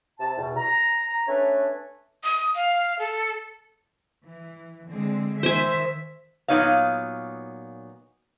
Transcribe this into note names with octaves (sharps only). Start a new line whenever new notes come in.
C3 A5
E2 B2
A#5
A3 C#4 D4 B4 C#5
D#6
F5
A4
E3
D3 G#3 C4
D#3 C5 E5 G#5
A#2 F#3 B3 D#4 C#5 F5